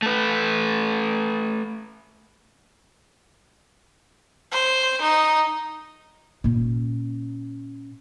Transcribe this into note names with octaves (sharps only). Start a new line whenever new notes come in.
A3 B4
C5
D#4
A#2 C#4